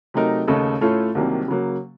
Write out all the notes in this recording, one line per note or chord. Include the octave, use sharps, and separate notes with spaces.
C3 F#3 A3 D#4 A#4
D#2 C#3 A3 D#4 A4
A2 A3 C#4 F4 A4
C2 C3 D#3 F#3 A#3
C#3 F#3 A#3